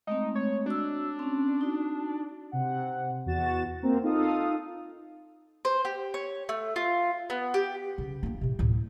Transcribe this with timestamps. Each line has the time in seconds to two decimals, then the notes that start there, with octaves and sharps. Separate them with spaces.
0.07 G#3 A3 C4 D#4
0.35 C#5
0.66 D4 F#4 E6
1.19 C4 C#4
1.61 D#4 F#4
2.52 C3 F#5
3.26 E2 F#4 A6 E7
3.83 A#3 C4 A#4
4.03 D#4 F4 A4 F5 D#6
5.65 C5
5.85 G4
6.14 C#5
6.49 A3
6.76 F4
7.30 B3
7.54 G4
7.98 C#3
8.23 A#3 D4
8.41 A2 C3
8.59 D2 A2